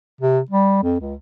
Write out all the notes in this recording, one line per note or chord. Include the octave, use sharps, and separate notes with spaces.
C3
G3
F2
C#2